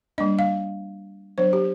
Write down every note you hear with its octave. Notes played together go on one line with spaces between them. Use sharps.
G3 A#3 D4 D#5
F5
F#3 B3 D4 C5
G4